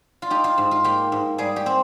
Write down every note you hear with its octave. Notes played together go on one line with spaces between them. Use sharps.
F4
D#4 G4
F4
G#2
F4
A#3 G4
G#2
G3 G#4
G4
C4